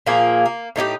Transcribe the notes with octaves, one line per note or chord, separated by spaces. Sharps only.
A#2 F3 A#3 G#4
A#3
A2 D#4 E4 G4